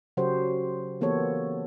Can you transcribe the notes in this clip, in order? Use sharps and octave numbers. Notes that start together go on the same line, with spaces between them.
C#3 F#3 F#4 G4 A4 C5
E3 A#3 B3 G4 A4 C#5